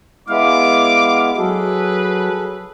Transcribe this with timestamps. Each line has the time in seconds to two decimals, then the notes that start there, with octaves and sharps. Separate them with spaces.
0.28 G#3 B3 E4 F5 D6
1.37 F#3 G#4 A4 B4